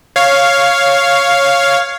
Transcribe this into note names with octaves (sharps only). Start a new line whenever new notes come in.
C#5 F5